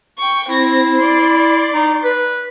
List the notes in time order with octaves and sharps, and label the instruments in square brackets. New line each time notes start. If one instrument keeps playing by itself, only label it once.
[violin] G5 C#6
[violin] C4 A#6 [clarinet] E4
[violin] D5 C6
[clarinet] D#4
B4